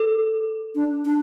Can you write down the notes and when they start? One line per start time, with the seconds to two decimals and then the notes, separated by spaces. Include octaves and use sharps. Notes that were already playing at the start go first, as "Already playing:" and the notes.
Already playing: A4
0.75 D4
1.05 D4